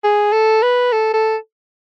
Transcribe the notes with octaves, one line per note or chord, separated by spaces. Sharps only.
G#4
A4
B4
A4
A4